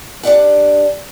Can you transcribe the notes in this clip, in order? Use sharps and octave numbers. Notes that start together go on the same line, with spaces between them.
D4 G4 D5 F#5